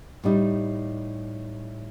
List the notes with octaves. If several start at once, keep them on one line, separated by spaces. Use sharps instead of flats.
A2 G3 D#4